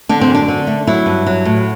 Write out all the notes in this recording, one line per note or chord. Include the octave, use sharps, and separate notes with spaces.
D3 D4
C4
F#2
D4
D3
A3
F#3 E4
G2
F#3
A2